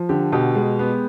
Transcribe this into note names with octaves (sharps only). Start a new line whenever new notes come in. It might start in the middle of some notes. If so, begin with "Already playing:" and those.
Already playing: F3
D3 G4
B2 G4
G#3
B3